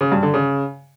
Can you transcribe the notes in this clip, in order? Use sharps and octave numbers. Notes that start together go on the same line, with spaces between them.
C#3
G2
D3
C#3